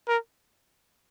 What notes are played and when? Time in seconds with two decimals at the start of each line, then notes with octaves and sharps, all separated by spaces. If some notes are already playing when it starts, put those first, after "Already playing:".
0.09 A#4